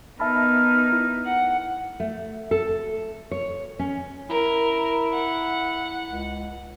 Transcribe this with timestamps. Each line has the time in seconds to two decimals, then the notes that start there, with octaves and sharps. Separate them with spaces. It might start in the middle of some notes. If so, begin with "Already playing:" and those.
0.20 B3 D#4 A#4 E5 A5 B5
0.93 E4
1.25 F#5
2.00 A3
2.51 A4
3.31 C#5
3.79 C#4
4.30 E4 A#4
5.13 F#5
6.09 C#2